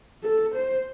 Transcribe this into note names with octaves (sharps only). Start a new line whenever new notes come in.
A4
C5